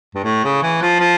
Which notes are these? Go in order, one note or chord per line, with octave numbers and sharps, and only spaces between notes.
G2
A2
C#3
E3
F3
F3